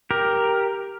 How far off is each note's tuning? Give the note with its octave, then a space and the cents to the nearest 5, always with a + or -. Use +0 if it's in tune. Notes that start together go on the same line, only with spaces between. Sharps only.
G4 +0 A#4 +5